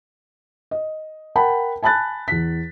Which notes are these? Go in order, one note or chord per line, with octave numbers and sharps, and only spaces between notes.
D#5
A#4 F#5 G5 A5 B5
G#5 A5 B5 F#6 A6
E2 B6